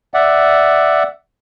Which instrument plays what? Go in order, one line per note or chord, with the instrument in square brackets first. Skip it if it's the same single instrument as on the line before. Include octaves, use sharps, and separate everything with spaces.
[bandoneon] D5 E5 F#5